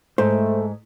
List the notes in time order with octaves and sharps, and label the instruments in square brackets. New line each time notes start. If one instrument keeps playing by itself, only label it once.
[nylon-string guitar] G#2 [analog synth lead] A3 [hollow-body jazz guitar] C5